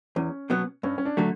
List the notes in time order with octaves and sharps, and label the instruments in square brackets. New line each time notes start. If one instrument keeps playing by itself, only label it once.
[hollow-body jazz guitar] E2 [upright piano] C#4
[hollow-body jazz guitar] B2 F#3 B3
[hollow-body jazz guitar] G2 [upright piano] C#4
[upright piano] C#4
D4
[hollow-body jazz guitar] D3 F#3 A3